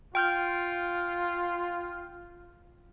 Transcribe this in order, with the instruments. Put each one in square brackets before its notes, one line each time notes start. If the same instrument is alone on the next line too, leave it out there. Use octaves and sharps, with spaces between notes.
[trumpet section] F4 [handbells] G5 F6 G6